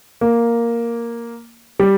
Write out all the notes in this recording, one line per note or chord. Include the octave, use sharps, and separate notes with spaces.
A#3
G3